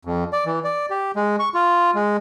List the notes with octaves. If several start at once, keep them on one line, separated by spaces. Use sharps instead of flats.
F2
D5
E3
D5
G4
G#3
C#6
F4
G#3